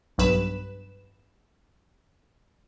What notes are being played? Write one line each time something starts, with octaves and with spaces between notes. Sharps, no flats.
B1 G2 B4 E7